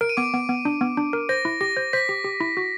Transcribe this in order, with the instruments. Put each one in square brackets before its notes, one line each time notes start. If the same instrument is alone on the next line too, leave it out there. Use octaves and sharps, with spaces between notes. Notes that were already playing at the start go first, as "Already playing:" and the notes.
[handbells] A#4 [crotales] D7
[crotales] D#7
[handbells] B3 [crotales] D6 D7
[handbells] B3
B3
D4
B3
D4
A#4
[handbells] C5 [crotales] A#6
[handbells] E4
[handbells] G4 [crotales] A#6
[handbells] C5
[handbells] C5 [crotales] B6
[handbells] G4
G4
E4
F#4